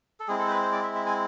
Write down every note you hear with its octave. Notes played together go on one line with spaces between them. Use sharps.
A4
G#3 C4 E4 G#4
A4
C5
B4
C5
D5
E5
E5
G#5